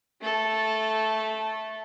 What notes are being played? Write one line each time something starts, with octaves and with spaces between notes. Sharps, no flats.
A3 A4